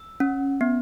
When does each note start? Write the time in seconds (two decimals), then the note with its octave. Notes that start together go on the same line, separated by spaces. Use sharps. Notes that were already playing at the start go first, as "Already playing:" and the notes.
Already playing: E6
0.20 C#4
0.61 B3